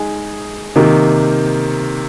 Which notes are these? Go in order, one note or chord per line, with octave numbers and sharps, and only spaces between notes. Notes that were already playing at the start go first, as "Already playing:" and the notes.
Already playing: G#3 D#4 G#4
C3 D#3 A#3